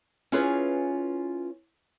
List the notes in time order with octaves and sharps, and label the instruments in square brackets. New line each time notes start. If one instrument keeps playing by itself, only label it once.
[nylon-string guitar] C#4 E4 F4 G#4 B4 C#5